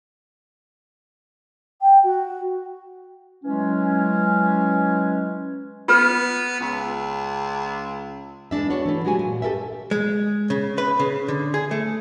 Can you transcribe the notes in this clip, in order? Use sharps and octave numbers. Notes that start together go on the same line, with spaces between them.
G5
F#4
E3 F#3 G#3 C#4
B3 F4 B4
C#2
E2 G#3 D4 E5
B3 D4 F#4 C#5
E3 A3
F#3 G#3 F#4 G4 G#5
A#2
G4 A4 A#4 C5 E5
G#3
C#3
B4
C#3
D3
G#4
A3